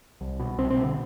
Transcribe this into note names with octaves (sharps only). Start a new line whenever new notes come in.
C2
B2
C2 C4
C4
B2
D3